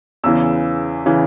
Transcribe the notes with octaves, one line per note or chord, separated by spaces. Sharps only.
E2 C#3 E3 E6
C#3 E3